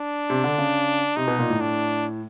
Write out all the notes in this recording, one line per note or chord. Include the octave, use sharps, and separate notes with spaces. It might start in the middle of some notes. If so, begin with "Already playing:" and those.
Already playing: D4
C3
D3
C#3
C3 D#4
B2
A#2
A2
D4